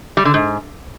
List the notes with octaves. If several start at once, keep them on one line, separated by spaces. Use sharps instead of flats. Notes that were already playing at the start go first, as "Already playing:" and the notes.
G3
D3
G#2